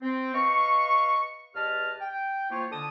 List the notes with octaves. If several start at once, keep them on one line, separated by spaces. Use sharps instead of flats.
C4
B4 D#5 F5 C#6
E2 G4 B4 D#5 A5 F6
G5
F3 A#3 E4 F4 C5 C#5
D3 A5 D#6